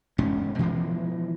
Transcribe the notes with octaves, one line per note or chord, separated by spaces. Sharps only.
E1 G#2 C#4
B2 E3 F3 G#3